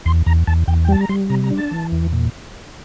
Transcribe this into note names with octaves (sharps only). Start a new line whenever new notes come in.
E2 C6
E2 A#5
E2 A5
E2 G5
G5
G3 A5
A#5
G3 C6
C3 A#5
A#5
D4
A5
E3
E2
A#2